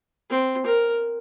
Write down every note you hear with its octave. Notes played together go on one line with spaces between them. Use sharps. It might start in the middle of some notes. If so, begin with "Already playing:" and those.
C4
A#4